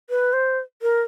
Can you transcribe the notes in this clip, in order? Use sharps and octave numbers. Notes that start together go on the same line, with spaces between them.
B4
C5
A#4